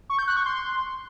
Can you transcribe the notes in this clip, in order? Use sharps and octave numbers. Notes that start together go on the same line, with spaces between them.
C#6
G6
F#6
C#6
C6